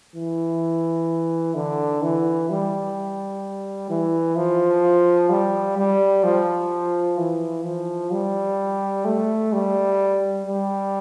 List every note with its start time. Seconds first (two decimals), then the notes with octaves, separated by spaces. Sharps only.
0.15 E3
1.55 D3
2.02 E3
2.50 G3
3.90 E3
4.36 F3
5.30 G3
5.77 G3
6.24 F3
7.18 E3
7.65 F3
8.11 G3
9.05 A3
9.53 G3
10.46 G3